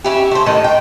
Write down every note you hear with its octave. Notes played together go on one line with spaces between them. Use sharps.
C#4 E4 G4
A3 C5
A2 D#3 D#5
G5